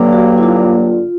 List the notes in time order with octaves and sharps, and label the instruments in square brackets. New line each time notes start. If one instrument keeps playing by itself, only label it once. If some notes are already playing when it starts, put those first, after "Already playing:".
Already playing: [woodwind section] G2 D3 F#3 A#3
[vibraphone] F#4
E4
F4